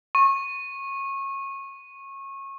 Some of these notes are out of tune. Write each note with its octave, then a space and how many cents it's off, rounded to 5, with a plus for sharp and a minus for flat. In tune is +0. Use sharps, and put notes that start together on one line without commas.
C#6 -25